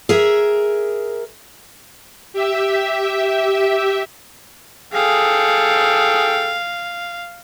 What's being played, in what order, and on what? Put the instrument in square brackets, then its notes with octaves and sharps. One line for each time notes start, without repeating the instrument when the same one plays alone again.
[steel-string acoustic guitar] G#4 A#4 E5
[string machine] G4 E5
[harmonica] G#4 A4 G5 [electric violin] F5